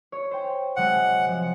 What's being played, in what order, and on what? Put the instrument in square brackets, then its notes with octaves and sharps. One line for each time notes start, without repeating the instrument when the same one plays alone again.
[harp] C#5
C5 G5
[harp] C3 F#3 G#3 [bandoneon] F#5
[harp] C3 F3